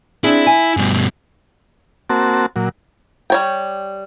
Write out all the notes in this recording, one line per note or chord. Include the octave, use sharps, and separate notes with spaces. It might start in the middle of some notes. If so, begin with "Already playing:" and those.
C4 D4 E4 G#4
G#5
G2 B2
A#3 C4 F#4 A5
A#2 F#3
G3 C#5 G5